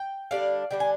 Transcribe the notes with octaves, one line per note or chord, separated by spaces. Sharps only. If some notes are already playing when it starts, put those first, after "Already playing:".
Already playing: G5
D3 G3 D4 D5 F5
D3 G3 D4 G5
G#5